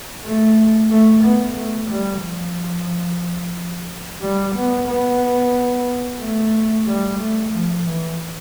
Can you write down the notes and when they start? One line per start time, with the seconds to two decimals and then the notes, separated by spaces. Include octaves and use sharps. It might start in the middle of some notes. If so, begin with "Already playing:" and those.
0.24 A3
0.91 A3
1.24 B3
1.57 A3
1.90 G3
2.23 F3
4.22 G3
4.55 B3
4.88 B3
6.21 A3
6.87 G3
7.20 A3
7.53 F3
7.87 E3